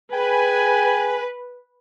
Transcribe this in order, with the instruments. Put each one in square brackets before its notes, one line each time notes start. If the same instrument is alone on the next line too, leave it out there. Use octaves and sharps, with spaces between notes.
[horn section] G#4 G5 G#5 [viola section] B4